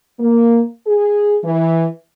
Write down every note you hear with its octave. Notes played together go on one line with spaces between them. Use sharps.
A#3
G#4
E3